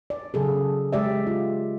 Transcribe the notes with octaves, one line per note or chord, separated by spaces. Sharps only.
D5
C#3 F#3 G#4 A4
G#3 G4 D5 E5
F4